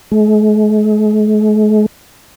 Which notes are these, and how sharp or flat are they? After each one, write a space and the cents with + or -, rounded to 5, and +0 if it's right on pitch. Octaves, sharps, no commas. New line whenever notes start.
G#3 +45